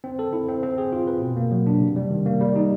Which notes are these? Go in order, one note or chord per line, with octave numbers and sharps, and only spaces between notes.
C4
A4
E4
C4
C4
G#4
F4
B4
B2
A#3
F#3
D4
C3
G3
D#3
A#3
G3
D#4